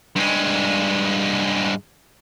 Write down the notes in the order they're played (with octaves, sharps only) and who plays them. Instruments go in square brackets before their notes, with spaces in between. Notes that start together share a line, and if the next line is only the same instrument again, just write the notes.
[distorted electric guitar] G2 G#3